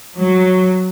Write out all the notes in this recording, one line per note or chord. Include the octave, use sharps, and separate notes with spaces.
F#3